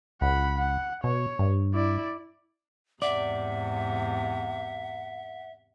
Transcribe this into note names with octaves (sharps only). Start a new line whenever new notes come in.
C#2 F#5 B5
F#5
B2 C#5
G2
E4 D5
E2 G#2 C3 D5 E5 F#5